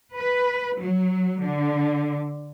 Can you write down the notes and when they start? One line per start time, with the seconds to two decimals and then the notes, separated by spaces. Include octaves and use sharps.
0.15 B4
0.78 F#3
1.42 D3